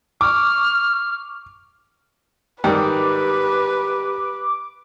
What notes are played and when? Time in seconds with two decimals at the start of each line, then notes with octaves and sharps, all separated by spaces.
0.21 C#6 D6 F6
2.64 G#2 D#3 G3 G4 B4 D6